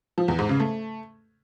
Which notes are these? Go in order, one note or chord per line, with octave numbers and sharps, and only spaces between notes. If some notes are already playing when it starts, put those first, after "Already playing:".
F3
E2
G#2
C#3
A3